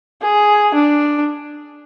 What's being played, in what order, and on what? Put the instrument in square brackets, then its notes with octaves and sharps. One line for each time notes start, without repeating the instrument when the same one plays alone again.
[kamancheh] G#4
D4